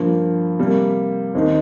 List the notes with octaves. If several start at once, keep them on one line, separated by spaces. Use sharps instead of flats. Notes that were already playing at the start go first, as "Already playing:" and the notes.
Already playing: G2 F3 A#3
C3 G3 A#3
D#2 D#3 C4 D#4